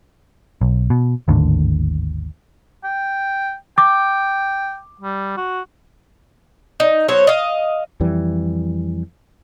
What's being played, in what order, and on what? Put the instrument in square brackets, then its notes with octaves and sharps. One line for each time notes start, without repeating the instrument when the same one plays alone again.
[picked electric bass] B1
B2
G#1 D#2 A2 D3
[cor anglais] G5
[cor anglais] G5 [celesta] D6
[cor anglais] G3
F#4
[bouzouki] D#4
F#3 B3 C5 C#5
D#5 F5
[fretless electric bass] F2 E3 G3